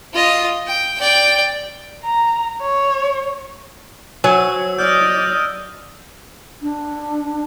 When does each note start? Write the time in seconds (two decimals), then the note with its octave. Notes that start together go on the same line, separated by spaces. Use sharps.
0.14 F4 D#5
0.67 G5
1.00 D5 G5
2.04 A#5
2.61 C#5
4.24 F#3 C5 C#5 G#5 E6
4.79 D5 D#5 D#6 F6 G6
6.61 D4